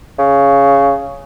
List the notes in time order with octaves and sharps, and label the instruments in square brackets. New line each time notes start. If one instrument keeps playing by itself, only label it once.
[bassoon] C#3